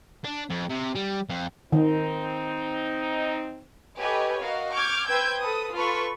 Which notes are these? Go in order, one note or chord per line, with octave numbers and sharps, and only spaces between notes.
D4
F2
C3
G3
F2
D#3 C4 D#4
G4 A4 B4 C#5 D#5 G#5
F#4 A#4 D#5 F5
C#6 D6 F6 G6 G#6
B4 C5 G5 E6 G6 G#6
A4 B4 D#6
F4 A4 B4 B5 C#6